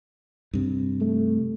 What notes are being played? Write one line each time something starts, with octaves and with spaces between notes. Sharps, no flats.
G2 C3
A3